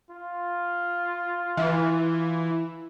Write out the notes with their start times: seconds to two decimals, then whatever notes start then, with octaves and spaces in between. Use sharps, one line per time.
0.11 F4
1.57 E3